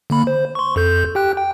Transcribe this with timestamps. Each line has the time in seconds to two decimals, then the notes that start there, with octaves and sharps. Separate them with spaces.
0.10 D3 A#3 B5
0.27 C5
0.55 C6 C#6
0.76 F2 A4 G6
1.15 G4 G5 F#6
1.37 G5